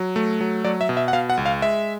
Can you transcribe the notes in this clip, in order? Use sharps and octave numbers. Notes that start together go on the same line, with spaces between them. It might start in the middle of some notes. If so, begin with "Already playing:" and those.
Already playing: F#3
A3
F#3
F#3 D5
E5
B2
E5
F#5
B2 F5
F#5
C#2
F5
G#3 E5